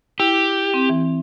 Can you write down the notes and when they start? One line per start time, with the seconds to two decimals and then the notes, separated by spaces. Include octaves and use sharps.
0.20 E4 G4
0.74 C4
0.89 E3